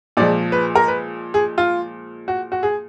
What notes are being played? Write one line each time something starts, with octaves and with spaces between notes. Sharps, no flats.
A#2 F3 G#3 D5
B4
A#4
B4
G#4
F4
F#4
F#4
G#4